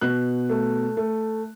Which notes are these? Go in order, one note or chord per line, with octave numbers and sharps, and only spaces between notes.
B2 F#6
A3
A3